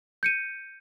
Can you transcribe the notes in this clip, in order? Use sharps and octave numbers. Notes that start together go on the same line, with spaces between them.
G6 C#7 D#7